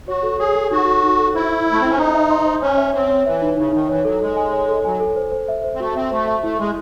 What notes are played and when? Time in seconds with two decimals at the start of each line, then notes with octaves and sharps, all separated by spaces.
0.08 F#4 C#5
0.23 A4
0.39 G#4 C#5
0.55 A4
0.71 D#4 F#4
0.87 A4
1.03 D#4
1.19 A4
1.35 E4 C5
1.51 E5
1.67 E5
1.72 A3
1.81 C4 C5
1.90 C#4
1.98 D#4 C5
2.14 E5
2.30 C6
2.46 C5
2.62 C#4 C#5
2.77 E5
2.94 C4 C#5
3.09 C#5
3.26 E3 E5
3.42 D#4
3.57 C#3 D#4
3.73 D#3 D#4
3.89 E3 C#5
4.05 F#3 A4
4.20 G#3 A4
4.37 G#5
4.53 C#5
4.68 A4
4.85 F#3 G#5
5.00 A4
5.16 C5
5.32 C5
5.48 E5
5.64 C5
5.75 C4
5.80 A3 F#4
5.96 C4 E5
6.11 A3 C5
6.27 E5
6.43 A3 E4
6.59 G#3 E4